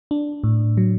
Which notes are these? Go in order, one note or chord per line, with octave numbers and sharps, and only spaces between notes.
D4
A2
F#3